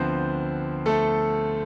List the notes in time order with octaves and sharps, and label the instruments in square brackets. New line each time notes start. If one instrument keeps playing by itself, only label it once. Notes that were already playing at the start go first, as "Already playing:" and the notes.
Already playing: [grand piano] D2 D3 F3 B3 C4 C5
A3 A4